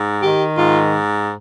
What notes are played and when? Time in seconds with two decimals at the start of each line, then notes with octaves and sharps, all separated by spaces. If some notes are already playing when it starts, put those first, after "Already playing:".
Already playing: G#2
0.23 D#3 G4
0.56 G#2 F4